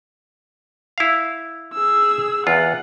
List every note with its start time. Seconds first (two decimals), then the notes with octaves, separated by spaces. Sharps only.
0.98 E4 F5
1.74 G#4 E6
2.47 E2 F4 F#5